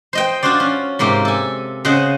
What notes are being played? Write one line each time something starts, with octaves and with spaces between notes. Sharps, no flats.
C5 D#5 G5
D4 F4 F#4 C5 D5
C#4
G#2 C3 A#3 G4
A4 G#5
C#3 G#4 C5 D#5 F#5